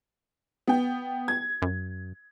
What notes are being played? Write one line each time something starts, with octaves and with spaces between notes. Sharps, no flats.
B3 G5
G#6
F#2